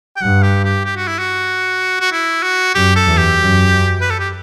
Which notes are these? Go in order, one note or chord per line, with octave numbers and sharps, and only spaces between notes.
G5
G2 F#5
G4
G4
G4
F#4
E4
F#4
F#4
E4
F#4
F#2 G4
A4
E2
G4
F#2
B4
A4
G4